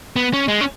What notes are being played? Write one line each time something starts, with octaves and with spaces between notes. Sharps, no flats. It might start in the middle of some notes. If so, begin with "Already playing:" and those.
B3
C#4
G#3
C#4